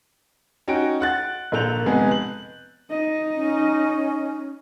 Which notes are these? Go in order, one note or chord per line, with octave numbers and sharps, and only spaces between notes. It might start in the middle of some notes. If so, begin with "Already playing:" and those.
C#4 D#4 F#4 G5 D7
F#5 F#6 A6
A#1 A#3 A4 F#6 G6 F7
F1 G#3 B3 G#4
F#7
D#4 D#5
C#4